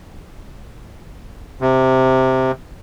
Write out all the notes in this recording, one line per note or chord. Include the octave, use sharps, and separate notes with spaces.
C3